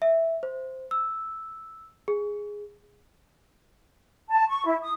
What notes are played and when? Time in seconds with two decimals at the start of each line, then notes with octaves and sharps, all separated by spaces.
0.02 E5
0.43 C5
0.91 E6
2.08 G#4
4.30 A5
4.50 C#6
4.65 E4
4.82 D#6